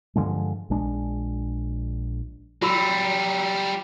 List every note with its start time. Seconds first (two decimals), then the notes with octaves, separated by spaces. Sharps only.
0.16 G2 D3 F3 G#3
0.70 A#1 G#3 D4
2.62 F#3 G3 F#4 B5 E6